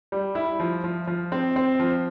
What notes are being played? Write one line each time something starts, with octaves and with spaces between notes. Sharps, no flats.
G3
E4
F3
F3
F3
C4
C4
F3